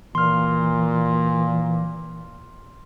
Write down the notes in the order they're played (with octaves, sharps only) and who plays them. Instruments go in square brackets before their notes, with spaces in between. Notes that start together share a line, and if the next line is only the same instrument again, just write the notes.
[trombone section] A#2 [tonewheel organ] E3 [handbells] C6 F6